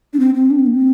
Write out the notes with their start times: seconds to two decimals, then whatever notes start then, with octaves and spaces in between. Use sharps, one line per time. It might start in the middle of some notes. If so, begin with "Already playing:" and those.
0.13 D4
0.20 C4
0.35 C4
0.51 D4
0.59 C4
0.66 A#3
0.74 C4